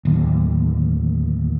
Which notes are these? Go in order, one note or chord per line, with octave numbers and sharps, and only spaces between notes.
D1 D#2